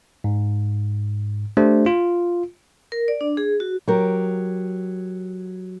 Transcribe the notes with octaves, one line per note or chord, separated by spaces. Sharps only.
G#2
A3 D4 G4 C5
F4
A#4
D5
D4
G#4
F#4
F#3 G4 A#4